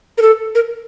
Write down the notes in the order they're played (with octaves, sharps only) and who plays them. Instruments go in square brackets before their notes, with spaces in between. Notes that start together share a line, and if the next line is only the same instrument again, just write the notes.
[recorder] A#4
A4
A#4